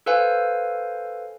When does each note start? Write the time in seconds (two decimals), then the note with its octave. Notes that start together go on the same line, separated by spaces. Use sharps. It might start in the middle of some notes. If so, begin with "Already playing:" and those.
0.06 A4 B4 C5 F5 G#5